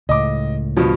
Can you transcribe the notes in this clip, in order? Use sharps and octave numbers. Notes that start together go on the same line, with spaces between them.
C#2 A2 D#5 D6
G2 B2 F3